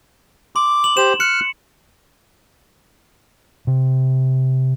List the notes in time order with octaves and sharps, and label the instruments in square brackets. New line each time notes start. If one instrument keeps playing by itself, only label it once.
[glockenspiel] C6 [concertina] D6
[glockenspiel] F#7
[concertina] G4 C5 [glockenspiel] E7
[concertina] F6 F#6 [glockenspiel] C#7
[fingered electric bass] C3